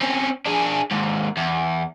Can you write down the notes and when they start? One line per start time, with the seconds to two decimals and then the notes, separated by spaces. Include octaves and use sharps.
0.01 C4 C#4
0.46 D4 G#4
0.91 D#2 G#2
1.37 E2